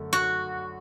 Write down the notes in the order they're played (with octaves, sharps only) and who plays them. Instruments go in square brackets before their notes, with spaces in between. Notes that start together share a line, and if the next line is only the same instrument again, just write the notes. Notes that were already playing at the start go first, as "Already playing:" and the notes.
Already playing: [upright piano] F#2 D3 A3
[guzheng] F#4